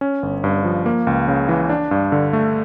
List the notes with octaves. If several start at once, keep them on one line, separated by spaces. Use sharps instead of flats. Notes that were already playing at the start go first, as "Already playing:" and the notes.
C#4
G1
G2
F3
A#3
C#2
C#3
E3
D4
G2
D3
A3